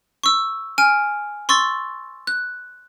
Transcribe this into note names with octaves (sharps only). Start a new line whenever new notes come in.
C#6 E6
G#5 F6 D7
C6 C#6 E6 A6
F#6